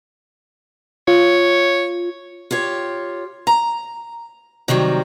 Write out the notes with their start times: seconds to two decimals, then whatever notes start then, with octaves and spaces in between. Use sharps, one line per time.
1.08 F4 C#5
2.51 F4 G4 C#5
3.47 A#5
4.68 C3 D#3 F#3 G3